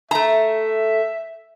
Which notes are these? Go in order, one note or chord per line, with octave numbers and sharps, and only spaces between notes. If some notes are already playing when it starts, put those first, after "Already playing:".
A3 E5 A#5